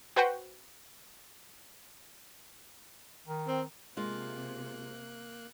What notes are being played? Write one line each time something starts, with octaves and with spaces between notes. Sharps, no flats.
F#4 B4 C5 F#5 G5
D#3
C4
C3 G#3 A#3 F4 F#6